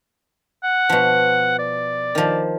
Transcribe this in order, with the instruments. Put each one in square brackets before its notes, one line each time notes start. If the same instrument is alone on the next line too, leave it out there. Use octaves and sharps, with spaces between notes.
[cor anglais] F#5
[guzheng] B2 F3
[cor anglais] D5
[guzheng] D#3 F3